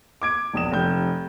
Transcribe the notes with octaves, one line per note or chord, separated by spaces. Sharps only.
D6 G#6 D7
E1 A#1 D#6 E7
F1 G6